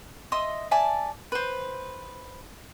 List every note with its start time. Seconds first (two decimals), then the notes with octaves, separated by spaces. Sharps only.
0.32 D#5 E5 C6 D#6
0.71 D5 E5 G#5 A5
1.32 B4 C5